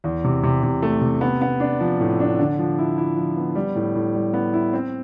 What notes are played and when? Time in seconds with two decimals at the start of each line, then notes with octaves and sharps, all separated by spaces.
0.04 E2
0.24 C3
0.43 C3
0.63 C3
0.83 A3
1.02 C3
1.21 B3
1.41 B3
1.60 D4
1.80 F3
2.00 A2
2.20 D4
2.39 D3
2.59 F3
2.78 E4
2.98 E4
3.17 F3
3.37 B3
3.55 G3
3.75 A2
3.95 A2
4.15 G3
4.34 B3
4.54 E4
4.73 C4